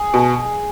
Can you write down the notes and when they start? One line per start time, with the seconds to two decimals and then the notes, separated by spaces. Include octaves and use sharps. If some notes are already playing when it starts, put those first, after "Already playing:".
Already playing: G#4
0.14 B2